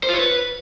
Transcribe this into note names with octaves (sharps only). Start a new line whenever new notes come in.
C5
F4
C#5
B4